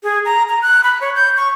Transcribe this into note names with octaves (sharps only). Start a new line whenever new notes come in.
G#4
A#5
A#5
F#6
B5
C#5
G6
C#6